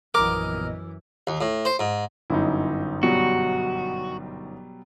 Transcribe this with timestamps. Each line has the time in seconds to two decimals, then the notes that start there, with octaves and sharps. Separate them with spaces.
0.14 A#1 F#2 E3 B3 A#4 D#5 D6
1.27 D#2
1.41 A2
1.65 C5
1.79 G#2
2.30 G1 F#2 D#4 E4
3.03 B2 F#3 G3 F#4